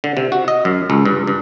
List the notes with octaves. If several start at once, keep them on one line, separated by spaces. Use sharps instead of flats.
D3
C3
F#4
D#5
F#2
C#2
G2
G2